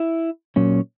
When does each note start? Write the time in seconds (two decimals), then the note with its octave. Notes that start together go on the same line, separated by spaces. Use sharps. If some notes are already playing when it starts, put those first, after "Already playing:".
Already playing: E4
0.56 A#2 F#3 C#4